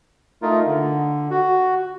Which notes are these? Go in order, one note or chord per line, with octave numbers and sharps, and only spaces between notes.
A3 D#4 F4 A#4
D3
F#4